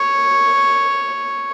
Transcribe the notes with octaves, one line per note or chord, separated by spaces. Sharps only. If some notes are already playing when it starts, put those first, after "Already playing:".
Already playing: C#5